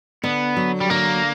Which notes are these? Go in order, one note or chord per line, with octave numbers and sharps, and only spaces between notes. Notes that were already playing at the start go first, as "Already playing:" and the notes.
D3 B3
F#3
G3
D3 A#3